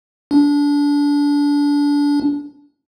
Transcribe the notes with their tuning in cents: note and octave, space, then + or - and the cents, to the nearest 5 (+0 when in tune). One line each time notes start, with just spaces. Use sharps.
D4 -25